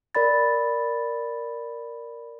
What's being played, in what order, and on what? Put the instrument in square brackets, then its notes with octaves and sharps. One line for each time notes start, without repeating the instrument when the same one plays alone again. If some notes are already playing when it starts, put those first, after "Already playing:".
[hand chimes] A#4 D5 B5 A6